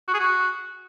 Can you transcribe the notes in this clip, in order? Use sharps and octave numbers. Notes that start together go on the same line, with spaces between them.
F#4
G#4
F#4